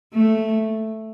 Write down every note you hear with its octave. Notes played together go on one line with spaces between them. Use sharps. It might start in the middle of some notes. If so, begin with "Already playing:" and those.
A3